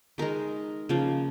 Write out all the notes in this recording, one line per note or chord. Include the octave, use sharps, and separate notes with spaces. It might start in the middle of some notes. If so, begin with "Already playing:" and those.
D#3 G#3 A#4
C#3 F3 A#3